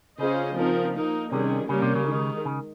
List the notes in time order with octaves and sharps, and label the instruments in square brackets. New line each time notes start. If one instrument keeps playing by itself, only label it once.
[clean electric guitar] C#3 [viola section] C#4 F4 G#4 C5 D#5
[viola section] F3 C4 D#4 A#4
A#3 D#4 A#4
[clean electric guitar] C3 [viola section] D#3 G3 C#4 G#4
[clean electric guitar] C#3 [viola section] G3 A#3 C#4 G4 A#4
[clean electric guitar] C3
C#3
[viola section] D#3 G#3 D#4
[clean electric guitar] C#3